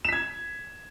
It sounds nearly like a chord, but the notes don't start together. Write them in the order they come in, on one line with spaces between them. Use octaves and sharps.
E7 B6 G#6